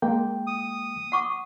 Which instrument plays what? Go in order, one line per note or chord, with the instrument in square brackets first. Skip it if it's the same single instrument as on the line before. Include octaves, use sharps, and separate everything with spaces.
[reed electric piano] G#3 A#3 G5
[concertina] D#6
[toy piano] F#5 C#6 D6